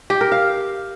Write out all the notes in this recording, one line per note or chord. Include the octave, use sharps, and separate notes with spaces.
G4
A#4
F5